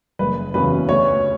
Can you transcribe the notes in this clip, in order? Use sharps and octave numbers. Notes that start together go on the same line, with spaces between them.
F#1 B4
E2 C#3 F#3 B4
D2 C#5